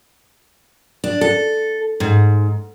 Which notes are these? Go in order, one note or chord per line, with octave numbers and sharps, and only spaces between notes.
D4
A4
G#2